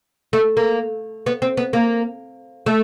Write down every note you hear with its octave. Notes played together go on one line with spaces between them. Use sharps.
A3
A#3
B3
C4
B3
A#3
A3